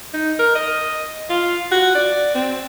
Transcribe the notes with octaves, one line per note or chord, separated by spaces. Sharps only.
D#4
A#4
D#5
F4
F#4
D5
C4